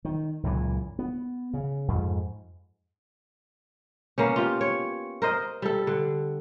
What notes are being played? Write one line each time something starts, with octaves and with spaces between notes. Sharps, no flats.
D#3
C#2 F#2 A#2 E3
B3
C#3
F2 G#2
A#3 B3 C#4
F4 G4
C#5
A#4 C5 D#5
G3 A4
D3